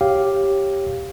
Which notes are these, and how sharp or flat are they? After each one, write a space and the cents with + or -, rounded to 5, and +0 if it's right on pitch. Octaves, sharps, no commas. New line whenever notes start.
G4 +0 C#5 -15 F5 +0